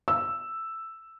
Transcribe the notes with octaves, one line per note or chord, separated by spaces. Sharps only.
E6